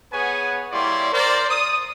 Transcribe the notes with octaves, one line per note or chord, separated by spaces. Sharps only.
B3 G#4 B4 C#5 F#5 G#5
G3 A#3 E4 C#5 D5 C6
A#4 C5 D5
D#6